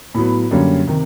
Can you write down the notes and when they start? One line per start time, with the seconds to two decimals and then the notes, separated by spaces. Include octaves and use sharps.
0.14 A2 F#3 B3
0.51 F#2 D3 G3 A#3 C#4
0.87 C3 D#3